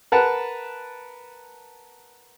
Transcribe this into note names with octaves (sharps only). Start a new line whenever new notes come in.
A#4 B4 F#5 A5